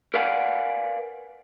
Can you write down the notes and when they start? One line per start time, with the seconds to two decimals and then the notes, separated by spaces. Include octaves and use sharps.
0.14 A#4 B4 D5 F5 F#5 G#5